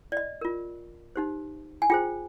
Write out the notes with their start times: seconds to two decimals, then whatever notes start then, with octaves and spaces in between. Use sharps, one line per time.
0.12 D5
0.17 D#5
0.41 F4 A#4
1.16 D#4 G4 C5
1.82 G#5
1.90 F4 G#4 C5 G5